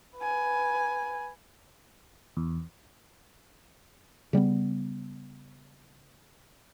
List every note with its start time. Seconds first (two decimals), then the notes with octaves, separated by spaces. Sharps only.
0.18 B4 G#5
2.37 E2
4.33 C#3 G3 A3 B3